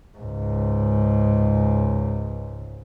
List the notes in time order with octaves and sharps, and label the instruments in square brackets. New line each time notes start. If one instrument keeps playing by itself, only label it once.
[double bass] C#2 G#2